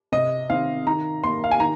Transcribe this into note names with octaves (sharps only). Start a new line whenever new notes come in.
C3 D#5
D#3 C4 F5
D#3 A#5
A#3 C6
F5
G#5
D#3 A#5